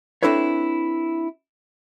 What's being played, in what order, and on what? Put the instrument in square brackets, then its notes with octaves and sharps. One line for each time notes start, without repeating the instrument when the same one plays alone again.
[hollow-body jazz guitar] C4 D4 E4 A4 B4 C#5